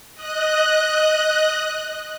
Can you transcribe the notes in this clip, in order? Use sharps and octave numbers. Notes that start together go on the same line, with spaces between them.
D#5 F#6